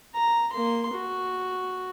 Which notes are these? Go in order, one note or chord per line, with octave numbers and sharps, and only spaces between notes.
A#5
A#3 C6
F#4